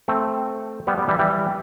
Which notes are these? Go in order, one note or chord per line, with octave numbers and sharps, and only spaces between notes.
A3 C4
G3 B3
G3 B3
E3 G3
E3 G3